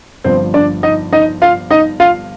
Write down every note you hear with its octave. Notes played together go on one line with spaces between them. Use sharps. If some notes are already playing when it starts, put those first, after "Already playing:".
G1 G2 F3 C4 C5
D4 D5
D#4 D#5
D#4 D#5
F4 F5
D#4 D#5
F4 F5